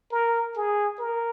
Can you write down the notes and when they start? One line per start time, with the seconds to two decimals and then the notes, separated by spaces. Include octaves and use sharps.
0.11 A#4
0.57 G#4
1.00 A#4